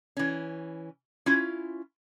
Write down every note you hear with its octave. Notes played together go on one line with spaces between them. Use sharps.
E3 C#4
C#4 E4 F4